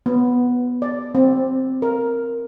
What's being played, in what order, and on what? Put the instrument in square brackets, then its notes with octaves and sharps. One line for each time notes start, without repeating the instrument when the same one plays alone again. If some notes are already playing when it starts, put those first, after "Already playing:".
[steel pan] B3
D5
C4
A#4